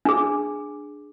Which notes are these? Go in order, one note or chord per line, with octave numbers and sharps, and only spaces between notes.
D4 G#4